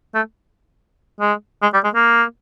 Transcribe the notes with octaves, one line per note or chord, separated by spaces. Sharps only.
A3
G#3
G#3
G3
G#3
A#3